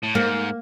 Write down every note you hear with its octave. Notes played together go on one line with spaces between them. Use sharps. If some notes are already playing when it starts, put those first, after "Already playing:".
A2
G#2 A#3